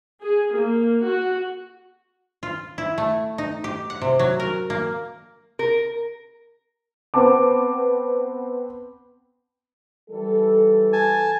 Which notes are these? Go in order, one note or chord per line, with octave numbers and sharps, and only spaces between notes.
G#4
A#3
F#4
F4
E4
A3
D#4
G4
F#5
C3
F#3
A#4
A#3
A#4
B3 C4 A5 D6
E3 G3 A4
G#5 A5